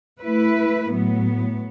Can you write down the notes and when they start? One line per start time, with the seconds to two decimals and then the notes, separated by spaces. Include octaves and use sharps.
0.21 A3 E4 B4
0.91 A2 F#3 B3